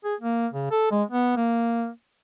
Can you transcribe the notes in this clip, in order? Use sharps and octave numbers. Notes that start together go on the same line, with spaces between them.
G#4
A#3
C#3
A4
G#3
B3
A#3